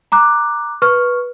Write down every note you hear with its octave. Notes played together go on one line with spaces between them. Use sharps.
A#5 D6 F#6
B4 C#6 F6